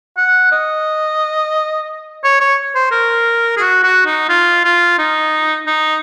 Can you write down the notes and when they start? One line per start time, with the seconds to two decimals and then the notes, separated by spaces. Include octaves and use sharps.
0.17 F#5
0.52 D#5
2.24 C#5
2.40 C#5
2.75 C5
2.92 A#4
3.57 G#4
3.60 F#4
3.83 F#4
4.06 D#4
4.29 F4
4.64 F4
4.99 D#4
5.67 D#4